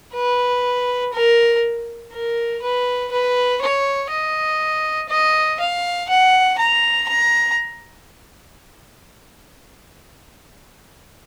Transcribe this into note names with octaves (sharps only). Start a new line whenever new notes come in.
B4
A#4
A#4
B4
B4
C#5
D#5
D#5
F5
F#5
A#5
A#5